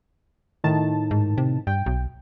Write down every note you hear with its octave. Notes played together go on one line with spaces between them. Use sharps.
A2 D#3 A5
G#2
C3
G2 G5
B1